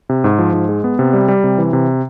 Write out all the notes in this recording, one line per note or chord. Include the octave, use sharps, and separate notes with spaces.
C3
G#2
F3
G#2
G#3
B3
C3
G3
G3
C3
E3
C3